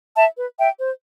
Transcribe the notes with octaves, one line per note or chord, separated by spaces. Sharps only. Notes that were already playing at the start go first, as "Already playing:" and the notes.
E5 A5
B4
E5 G5
C5